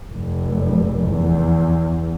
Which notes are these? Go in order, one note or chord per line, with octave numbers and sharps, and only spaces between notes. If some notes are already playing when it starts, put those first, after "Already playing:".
F1
E2